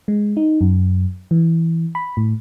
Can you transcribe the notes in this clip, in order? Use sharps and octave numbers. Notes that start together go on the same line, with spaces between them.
G#3
D#4
F#2
E3
B5
A2